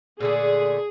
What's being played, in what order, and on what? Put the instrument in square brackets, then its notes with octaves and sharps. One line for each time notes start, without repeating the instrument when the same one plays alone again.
[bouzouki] A#2 D3 A3 [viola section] G#4